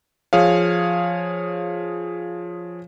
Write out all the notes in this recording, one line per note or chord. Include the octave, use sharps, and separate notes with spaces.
F3 G#4 C#5 F5